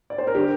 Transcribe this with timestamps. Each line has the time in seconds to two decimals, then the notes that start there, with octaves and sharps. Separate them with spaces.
0.10 D5
0.18 C5
0.27 A#4
0.35 D3 G4